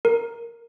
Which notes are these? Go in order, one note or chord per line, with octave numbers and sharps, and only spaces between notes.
A#4